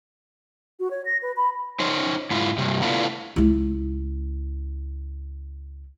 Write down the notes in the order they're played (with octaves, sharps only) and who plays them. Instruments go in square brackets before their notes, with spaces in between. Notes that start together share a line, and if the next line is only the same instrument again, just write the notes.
[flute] F#4
C#5
A#6
B4
B5
[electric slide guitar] D#4 C5 C#5
G#2 E4 F4
G2 C3 G3
A3 B3 D4 E4 F4
[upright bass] C#2 E4